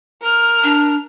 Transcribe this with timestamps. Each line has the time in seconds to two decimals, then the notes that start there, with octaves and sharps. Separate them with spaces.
0.21 A#4 F6
0.64 D4